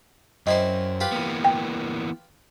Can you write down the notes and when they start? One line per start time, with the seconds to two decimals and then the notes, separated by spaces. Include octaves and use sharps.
0.47 F#2 C4 E4 C5 D#5
1.00 F4 G4 B4
1.12 E3 A#3 B3
1.44 G5